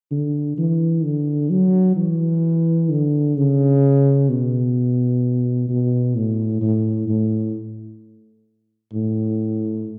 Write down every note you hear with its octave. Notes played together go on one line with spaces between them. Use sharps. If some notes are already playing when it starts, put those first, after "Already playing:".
D3
E3
D3
F#3
E3
D3
C#3
B2
B2
A2
A2
A2
A2